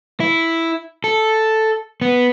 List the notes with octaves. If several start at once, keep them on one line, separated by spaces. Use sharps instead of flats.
E4
A4
B3